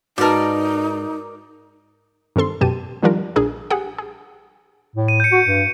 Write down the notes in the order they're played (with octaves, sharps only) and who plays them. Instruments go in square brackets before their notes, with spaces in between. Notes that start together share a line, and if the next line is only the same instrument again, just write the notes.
[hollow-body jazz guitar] G#2 A5 [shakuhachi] D#4 [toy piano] F#4 B4 [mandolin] A#4 D5
[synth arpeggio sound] G2 D#3 C4 A4 C6
F#2 B2 G4 A5 D#7
D#3 F3 G3 D4 F4 A#4
A#1 D4 G#4 A#4
G4 G#4 F#5
G#4
[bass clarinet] A2
[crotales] D#7
G6 C#7
[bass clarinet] F#4
G2